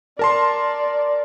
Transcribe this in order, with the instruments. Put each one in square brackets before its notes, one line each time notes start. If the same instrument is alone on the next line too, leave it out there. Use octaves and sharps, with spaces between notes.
[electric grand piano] A#4 A5 C6 [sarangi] D5